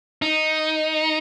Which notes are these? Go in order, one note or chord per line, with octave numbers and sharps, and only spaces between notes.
D#4